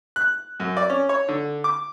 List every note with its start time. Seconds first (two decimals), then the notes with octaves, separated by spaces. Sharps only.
0.16 F#6
0.60 F#2
0.77 D5
0.90 C#4
1.09 C#5
1.29 D3
1.64 D6